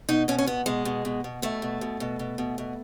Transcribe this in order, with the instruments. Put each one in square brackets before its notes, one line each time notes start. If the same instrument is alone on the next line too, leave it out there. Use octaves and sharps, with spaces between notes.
[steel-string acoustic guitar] B2 D#4
B2 C#4
C#4
B2 B3
B2 G#3
B2
B2
B2
B2 A3
B2
B2
B2
B2
B2
B2